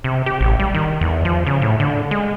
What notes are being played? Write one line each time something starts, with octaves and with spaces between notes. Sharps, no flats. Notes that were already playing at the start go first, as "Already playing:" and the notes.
C3
G4
A1
G3
D#3
E2
F3
C#3
A2
D3
G#3